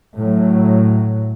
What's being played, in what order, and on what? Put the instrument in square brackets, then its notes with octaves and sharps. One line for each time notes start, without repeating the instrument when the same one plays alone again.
[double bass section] A2 F#3